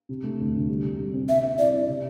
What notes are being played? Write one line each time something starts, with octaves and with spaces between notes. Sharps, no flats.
C3
A3
D2
D2
G3
C3
G3
C4
C4 E5
C4
E4 D5
E4
C3